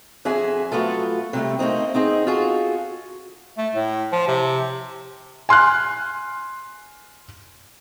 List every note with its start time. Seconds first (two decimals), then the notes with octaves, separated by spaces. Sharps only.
0.25 F2 G#4 E5 F#5 G#5
0.72 F#3 A3 B3 F4 A4
1.33 C3 G3 A3
1.59 A3 A#3 C4 D#4
1.94 B3 C4 D#4 G#4
2.27 F4 F#4 G#4 A4
3.57 A3
3.75 A2
4.12 F3
4.28 C3
5.49 G#5 C6 F6 F#6